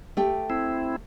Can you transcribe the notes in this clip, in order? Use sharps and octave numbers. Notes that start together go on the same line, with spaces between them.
A3 G4 G5
C4 E4